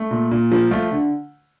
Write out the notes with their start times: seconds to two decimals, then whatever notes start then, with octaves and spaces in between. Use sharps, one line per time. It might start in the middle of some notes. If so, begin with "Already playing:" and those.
Already playing: A3
0.11 A#2
0.31 A#2
0.52 F3
0.71 A3 F4
0.91 D3